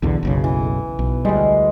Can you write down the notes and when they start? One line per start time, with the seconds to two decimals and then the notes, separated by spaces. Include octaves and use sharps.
0.02 B1 E2 D3
0.23 F#1 B1 C#3
0.44 E3
0.99 B1
1.25 D2 G3 G#3